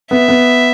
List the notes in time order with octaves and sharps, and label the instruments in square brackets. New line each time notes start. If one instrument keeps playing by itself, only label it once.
[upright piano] B3 [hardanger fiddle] E5
[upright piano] B3